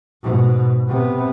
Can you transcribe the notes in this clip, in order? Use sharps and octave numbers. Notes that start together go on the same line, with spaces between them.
G#2 B2
C3 B3